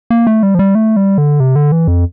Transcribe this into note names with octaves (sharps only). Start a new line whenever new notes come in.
A#3
A3
G3
F3
G3
A3
G3
D3
C3
D3
E3
F2